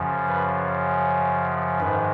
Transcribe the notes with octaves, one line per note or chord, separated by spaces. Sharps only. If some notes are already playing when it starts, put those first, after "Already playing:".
Already playing: F#2 C#3 F3
B4
G#2 D#3 B4